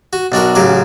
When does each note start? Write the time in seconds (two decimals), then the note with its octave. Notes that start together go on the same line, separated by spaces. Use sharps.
0.13 F#4
0.32 B1 D4 F#4 A#4
0.55 A1 C#3 F#3 A#4 D6